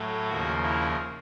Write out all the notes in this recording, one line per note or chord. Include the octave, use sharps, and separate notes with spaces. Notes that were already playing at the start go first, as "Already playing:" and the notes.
Already playing: A2 F#3 A3
D#2 C#3 F3 A#3 F#4
E4